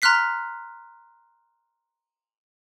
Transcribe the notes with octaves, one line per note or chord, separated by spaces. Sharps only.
A#5 C6 F6 F#6 B6 C7